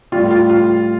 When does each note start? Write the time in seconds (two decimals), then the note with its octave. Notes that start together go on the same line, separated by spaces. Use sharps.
0.12 A2 G3 F4
0.31 F4
0.50 F4